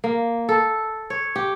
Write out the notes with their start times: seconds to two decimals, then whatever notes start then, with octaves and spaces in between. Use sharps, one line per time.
0.04 A#3
0.49 A4
1.10 C#5
1.36 G4